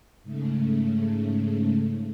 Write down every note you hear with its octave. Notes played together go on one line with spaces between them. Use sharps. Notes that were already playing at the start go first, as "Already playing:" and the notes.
G#2 C#3 A3